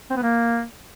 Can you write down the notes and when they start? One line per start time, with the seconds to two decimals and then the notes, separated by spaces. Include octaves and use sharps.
0.10 C4
0.16 B3
0.23 A#3